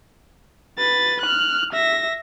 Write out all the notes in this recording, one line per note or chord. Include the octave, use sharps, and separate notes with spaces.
B4 A6
F6 F#6
E5 A#6